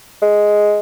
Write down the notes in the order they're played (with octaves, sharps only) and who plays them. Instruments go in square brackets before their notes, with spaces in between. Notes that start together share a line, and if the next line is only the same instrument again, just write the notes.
[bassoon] G#3